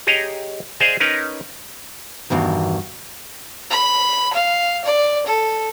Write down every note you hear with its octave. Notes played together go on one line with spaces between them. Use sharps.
G4 G#4 C#5 D#5 A#5
G#4 C5 D5 D#5 F5 G#5
C#4 D#4 A#4 B4
E2 G2 B2 D#3
B5
F5
D5
A4